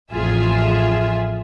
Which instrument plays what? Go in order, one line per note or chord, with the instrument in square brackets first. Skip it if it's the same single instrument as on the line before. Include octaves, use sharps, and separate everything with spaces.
[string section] A1 F2 F4 G#4 E5